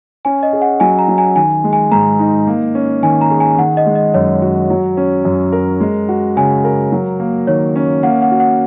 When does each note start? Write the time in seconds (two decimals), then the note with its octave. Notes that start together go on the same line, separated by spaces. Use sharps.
0.25 C#4 G#5
0.43 D#5
0.53 G#4
0.62 F#5
0.80 F#3 G#5
0.99 A#5
1.08 F#3
1.18 G#5
1.36 D#3 G#5
1.64 G#3
1.73 G#5
1.92 G#2 A#5
2.19 D#4
2.47 A#3
2.75 C#4
3.03 D#3 G#5
3.21 A#5
3.31 G#4
3.40 G#5
3.58 D#3 F#5
3.77 D#5
3.86 G#3
3.95 D#5
4.14 F#2 C#5
4.42 F#4
4.70 F#3
4.97 C#4
5.25 F#2
5.52 A#4
5.80 G#3
6.09 F#4
6.37 C#3 G#5
6.64 A#4
6.92 F#3
7.20 A#3
7.47 D#3 C#5
7.76 C#4
8.03 A#3 F#5
8.22 F#5
8.31 F#4
8.40 F#5